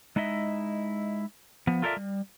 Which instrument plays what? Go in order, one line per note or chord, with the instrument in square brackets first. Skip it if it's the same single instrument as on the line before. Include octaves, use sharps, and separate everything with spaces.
[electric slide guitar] G#3 D#4 E4 D#5 E5
F3 B3
F4 A4 A#4 C5 D5 E5
G3